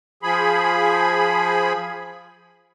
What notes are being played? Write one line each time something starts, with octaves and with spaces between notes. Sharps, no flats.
F3 G#4 B5